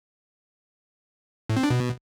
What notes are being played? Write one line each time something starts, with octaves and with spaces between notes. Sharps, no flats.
A2
C4
D4
B2